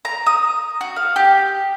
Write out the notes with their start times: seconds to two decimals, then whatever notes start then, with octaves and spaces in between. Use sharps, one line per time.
0.05 A#5
0.26 D#6
0.81 F#4
0.96 F5
1.16 G4